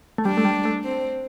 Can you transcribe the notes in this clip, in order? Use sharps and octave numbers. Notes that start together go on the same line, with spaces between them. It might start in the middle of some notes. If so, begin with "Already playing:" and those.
A3
G3 D4
A3
G3
A3
C4